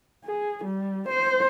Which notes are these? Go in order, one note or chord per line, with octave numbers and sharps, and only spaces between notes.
G#4
G3
C5